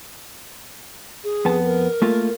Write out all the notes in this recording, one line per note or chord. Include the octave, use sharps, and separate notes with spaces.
G#4
F2 B3 A5
A#4
A3 A#3 F4